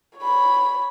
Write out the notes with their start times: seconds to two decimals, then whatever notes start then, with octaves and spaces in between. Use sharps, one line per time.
0.18 C#5 B5